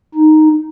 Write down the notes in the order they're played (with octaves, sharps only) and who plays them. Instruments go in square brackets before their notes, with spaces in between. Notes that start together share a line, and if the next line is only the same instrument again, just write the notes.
[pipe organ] D#4